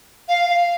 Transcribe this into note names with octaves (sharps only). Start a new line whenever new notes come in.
F5
F5